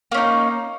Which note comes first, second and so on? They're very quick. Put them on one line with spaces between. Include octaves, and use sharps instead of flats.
A#3 C#4 D#4